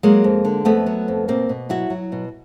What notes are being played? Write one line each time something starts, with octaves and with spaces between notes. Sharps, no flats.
F#3 G#3 A#3
F2
D3
F2 A3 B3
F#3
F2
B2 A#3 C4
B2
F#3 E4 F#4
F#3
B2